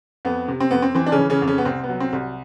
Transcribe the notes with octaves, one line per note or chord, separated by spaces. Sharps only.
F2 B3
C3
C4
F2 B3
C4
E3 C4
D4
C#3 C#4
E3
C#3 C#4
F2
C#3 C#4
B3
C2 C4
B3
F#3
C4
C2